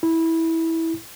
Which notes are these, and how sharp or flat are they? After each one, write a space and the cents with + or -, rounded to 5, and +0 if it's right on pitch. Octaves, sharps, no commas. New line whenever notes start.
E4 -15